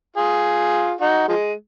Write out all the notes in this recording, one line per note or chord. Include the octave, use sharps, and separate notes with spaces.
F4 G#4
D#4 F#4
F3 G#3